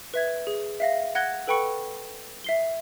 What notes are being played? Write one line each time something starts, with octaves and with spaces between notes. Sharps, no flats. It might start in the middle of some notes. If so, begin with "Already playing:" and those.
B4 E5 G#6
G#4
E5 F5 A#6
F#5 F#6 G#6 A#6 G7
A4 B4 G5 B5 C#6 C#7
E5 C7 G7